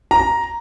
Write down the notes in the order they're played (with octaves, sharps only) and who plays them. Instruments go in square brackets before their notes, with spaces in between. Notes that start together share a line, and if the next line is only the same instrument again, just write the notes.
[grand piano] A#5